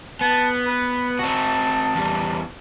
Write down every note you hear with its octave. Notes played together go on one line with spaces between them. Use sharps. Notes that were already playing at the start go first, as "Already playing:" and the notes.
B3 A5
B4
C4 F#4 A5
E2 G3